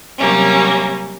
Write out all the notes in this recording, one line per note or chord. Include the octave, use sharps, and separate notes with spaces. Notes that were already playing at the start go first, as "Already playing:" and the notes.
C3 F#3 G3 A#3 C#4